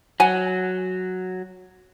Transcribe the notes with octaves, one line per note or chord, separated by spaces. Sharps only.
F#3 F#5 G#5